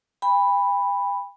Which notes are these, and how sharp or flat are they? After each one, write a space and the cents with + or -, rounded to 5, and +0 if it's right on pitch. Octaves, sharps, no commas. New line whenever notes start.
G5 +40 B5 +0